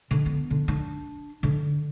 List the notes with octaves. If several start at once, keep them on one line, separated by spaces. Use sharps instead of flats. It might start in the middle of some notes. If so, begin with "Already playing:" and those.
D3
B3
D3
D4
D3